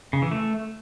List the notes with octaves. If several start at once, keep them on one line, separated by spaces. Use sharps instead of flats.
C#3
E3
A3